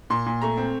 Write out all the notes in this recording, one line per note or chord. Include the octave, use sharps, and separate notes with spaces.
A#2 C6
A#2
A3 A#5
C4